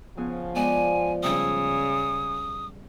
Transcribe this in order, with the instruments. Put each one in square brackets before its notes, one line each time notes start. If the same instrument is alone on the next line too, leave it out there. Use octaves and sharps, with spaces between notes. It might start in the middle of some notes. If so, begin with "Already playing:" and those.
[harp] C#3 B3 G#4 [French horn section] F3
[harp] G#3 B3 D5 [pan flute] G#5
[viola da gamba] C#3 [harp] G3 E6 [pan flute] D#6